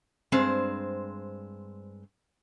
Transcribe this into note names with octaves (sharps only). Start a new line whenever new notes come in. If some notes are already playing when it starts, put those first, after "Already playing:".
G2 G#3 C4 C5